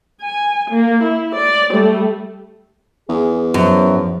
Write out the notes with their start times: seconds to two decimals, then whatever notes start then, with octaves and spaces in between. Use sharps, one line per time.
0.21 G#5
0.71 A#3
1.03 E4
1.35 D5
1.71 G3 A3
3.09 E2 G#4
3.54 F#2 F3